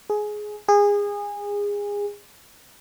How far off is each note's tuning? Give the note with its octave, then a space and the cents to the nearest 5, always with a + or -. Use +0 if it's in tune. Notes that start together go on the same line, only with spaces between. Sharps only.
G#4 +15
G#4 -25